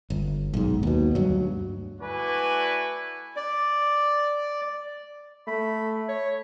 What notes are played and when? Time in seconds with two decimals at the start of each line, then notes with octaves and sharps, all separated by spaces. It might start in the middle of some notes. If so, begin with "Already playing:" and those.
0.10 G1
0.54 B1 G#2
0.83 D#2 B2
1.15 D2 G2 F#3
2.00 A3 E4 F#4 B4 D5 G#5
3.36 D5
5.47 A3 B5
6.08 C#5